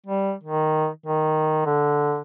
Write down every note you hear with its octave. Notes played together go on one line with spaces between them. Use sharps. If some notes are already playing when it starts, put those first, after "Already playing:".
G3
D#3
D#3
D3